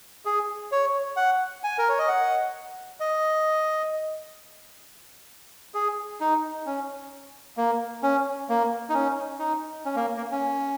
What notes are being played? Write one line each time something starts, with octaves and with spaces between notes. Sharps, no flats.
G#4
C#5
F#5
G#5
A#4
C#5
D#5
F#5
D#5
G#4
D#4
C#4
A#3
C#4
A#3
D#4
C#4
D#4
C#4
A#3
A#3
C#4